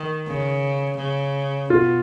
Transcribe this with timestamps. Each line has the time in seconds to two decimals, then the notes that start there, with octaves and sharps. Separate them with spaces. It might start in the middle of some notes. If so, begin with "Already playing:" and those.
Already playing: D#3
0.27 C#3
0.98 C#3
1.70 B2 F4